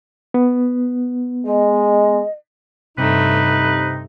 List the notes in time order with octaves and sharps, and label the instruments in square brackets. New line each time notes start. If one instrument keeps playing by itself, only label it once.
[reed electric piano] B3
[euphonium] G#3 [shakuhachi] D#5
[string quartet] G2 A3 [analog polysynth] C3 [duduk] D#4 [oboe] B4